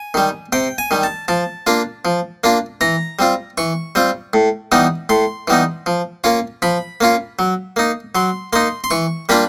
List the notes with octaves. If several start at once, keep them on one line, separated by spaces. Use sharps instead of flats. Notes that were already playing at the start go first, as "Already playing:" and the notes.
Already playing: G#5
D#3 G3
C3 G5
G#5
D#3 G3
A5
F3 A5
A#3 D4 F4
F3
A#3 D4 F4
E3 A#5
G3 C4 F4
E3 C#6
G3 C4 F4
A2
E3 G3 B3 D#4
A2 C6
E3 G3 B3 D#4
F3
A#3 C#4 F4
F3 B5
A#3 C#4 F4
F#3
A#3 D#4
F#3 C6
A#3 D#4 C6
C6
E3 C#6
G3 A#3 D4 F4 B5